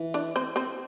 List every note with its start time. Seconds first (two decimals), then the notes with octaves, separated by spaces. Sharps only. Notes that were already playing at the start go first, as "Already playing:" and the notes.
Already playing: E3
0.14 D4 D5
0.36 C4 C5
0.56 C4 C5